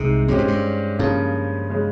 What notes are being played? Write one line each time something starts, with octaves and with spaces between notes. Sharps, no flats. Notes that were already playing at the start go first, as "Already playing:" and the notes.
Already playing: C2 C3 G#3 D#4 G#4
G2 G#3 C#4 G4 C5
G#2
G2
G2 C#3 F3 A#3 C#4 G#4
C#3 G#3 C#4 G#4